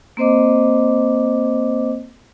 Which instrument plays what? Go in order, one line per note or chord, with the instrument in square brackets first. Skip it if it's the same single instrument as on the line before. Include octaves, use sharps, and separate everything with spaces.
[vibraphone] A#3 C4 C5 D#5 D6